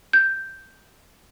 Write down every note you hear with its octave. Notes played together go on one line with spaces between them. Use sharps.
G6